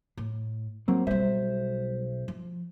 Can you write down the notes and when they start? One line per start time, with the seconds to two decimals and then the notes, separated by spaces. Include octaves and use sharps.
0.17 A2
0.88 E3 F#3 A#3 C4
1.07 B1 G3 B3 C5 E5
2.28 F3